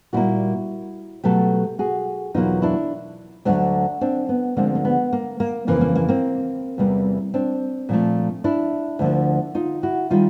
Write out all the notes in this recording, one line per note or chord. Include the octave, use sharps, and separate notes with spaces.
A#2 G3 A#3 E4 F#4
B2 F#3 A3 G4 A4
F#4 G#4
E2 B2 F#3 A#3 D#4 F4
D4 E4
D2 D3 F#3 A3 C4 D4
C4 D4
B3
D2 D3 F3 G#3 A#3 C4
A#3
B3
A#3
A#3
F2 C#3 E3 A#3
A#3
A#3
A#3 C4
E2 C3 E3 G3 A#3
C4 D4
A#2 F3 A3
D4 E4
D2 D3 F3 A#3
D#4 F4
E4 F#4
D#3 G3 A#3 D#4 F4